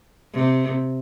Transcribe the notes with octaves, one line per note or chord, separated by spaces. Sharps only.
C3